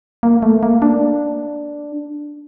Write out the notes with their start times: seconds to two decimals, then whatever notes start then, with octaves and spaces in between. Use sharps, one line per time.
0.23 A#3
0.43 A3
0.63 A#3
0.82 D4